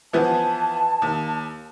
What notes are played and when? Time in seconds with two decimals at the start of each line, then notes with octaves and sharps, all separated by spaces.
0.13 E3 F3 B3 A5
1.02 D#2